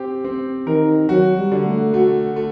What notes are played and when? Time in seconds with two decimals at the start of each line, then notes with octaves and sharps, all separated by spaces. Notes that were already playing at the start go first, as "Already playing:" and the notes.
Already playing: C4 G4
0.24 C4
0.67 D#3 A#4
1.09 F#3 F#4
1.38 G3
1.52 D3
1.66 A3
1.94 A3 F#4
2.36 A3